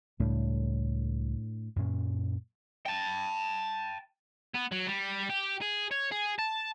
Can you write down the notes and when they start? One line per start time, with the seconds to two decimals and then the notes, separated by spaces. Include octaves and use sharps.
0.20 C#2 A2 G3 D4
1.76 F#2 A#2 C#4
2.86 G5 A5
4.54 B3
4.72 F#3
4.87 G3
5.30 G4
5.62 G#4
5.91 C#5
6.12 G#4
6.39 A5